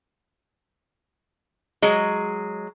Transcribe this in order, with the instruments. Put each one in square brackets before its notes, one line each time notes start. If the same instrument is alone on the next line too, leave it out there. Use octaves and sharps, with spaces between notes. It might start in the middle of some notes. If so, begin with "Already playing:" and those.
[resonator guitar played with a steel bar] F#3 G#3